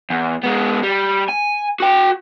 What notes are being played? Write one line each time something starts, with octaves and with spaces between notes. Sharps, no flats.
E2
G#3 B3
G3
G#5
F#4 G5